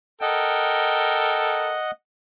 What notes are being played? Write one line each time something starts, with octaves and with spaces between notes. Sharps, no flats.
A4 A#4 D#5 F#5 G5